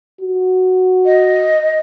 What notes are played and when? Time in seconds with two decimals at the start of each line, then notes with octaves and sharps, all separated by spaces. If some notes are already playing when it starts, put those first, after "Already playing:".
0.21 F#4
1.05 D#5